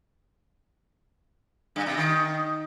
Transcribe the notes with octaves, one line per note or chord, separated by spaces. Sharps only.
G2
C3
D#3